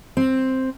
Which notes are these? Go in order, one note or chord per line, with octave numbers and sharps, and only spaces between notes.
C4